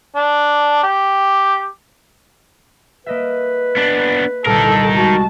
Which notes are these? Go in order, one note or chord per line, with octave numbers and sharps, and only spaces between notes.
D4
G4
A#3 B4 D#5 E5
B3 D4
G1 C2 A#2 D#4 A4 A#4
G#3 F#4 A5